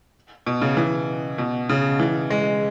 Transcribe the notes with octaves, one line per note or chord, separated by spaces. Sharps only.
B2
C#3
E3
B2
C#3
E3
G#3